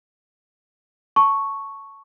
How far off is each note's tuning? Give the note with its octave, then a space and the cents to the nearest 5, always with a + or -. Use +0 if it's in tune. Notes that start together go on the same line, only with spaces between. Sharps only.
A5 +15 C#6 +0